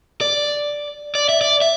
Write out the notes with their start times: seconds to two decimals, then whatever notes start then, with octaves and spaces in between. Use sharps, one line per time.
0.21 D5
1.15 D5
1.29 E5
1.41 D5
1.61 E5